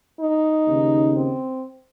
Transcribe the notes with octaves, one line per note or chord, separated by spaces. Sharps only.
D#4
D#2 C#3
C4